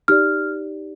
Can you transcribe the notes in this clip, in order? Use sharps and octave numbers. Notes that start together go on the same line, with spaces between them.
D#4 G4 D5 F6